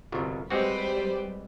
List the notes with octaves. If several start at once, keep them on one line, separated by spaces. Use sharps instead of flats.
G1 C2 B2
G3 G#3 C4 F#4 G4 B4 C5 D5